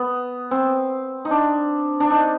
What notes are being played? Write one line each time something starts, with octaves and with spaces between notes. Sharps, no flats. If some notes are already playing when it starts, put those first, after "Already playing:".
Already playing: B3
C4
D#4
D4
D4
D#4